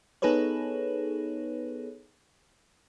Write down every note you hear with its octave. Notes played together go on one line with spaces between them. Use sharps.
B3 D#4 G#4 A4 B4 C#5